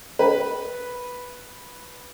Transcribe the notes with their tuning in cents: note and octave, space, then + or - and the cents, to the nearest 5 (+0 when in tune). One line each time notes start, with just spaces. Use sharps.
B4 -5